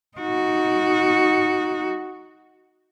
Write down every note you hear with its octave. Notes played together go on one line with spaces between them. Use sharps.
D#4 F#4